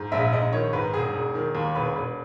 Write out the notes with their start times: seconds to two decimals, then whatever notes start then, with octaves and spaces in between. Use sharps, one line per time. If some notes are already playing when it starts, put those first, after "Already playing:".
Already playing: G#2
0.12 A#1 E5
0.32 A#1 D#5
0.52 D#3 C#5
0.73 G#2 B4
0.93 E1 G#4
1.14 E1
1.35 D#3
1.55 D#2
1.75 E1 B4
1.96 E1 B4